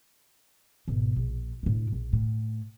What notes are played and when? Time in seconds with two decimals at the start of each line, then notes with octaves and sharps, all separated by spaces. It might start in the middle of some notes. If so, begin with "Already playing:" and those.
0.88 G#1 B2
1.16 A#1
1.63 A2 D4
1.92 A#1
2.13 A2